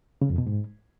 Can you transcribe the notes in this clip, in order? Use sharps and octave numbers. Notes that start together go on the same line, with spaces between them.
C#3
F2
B2
G#2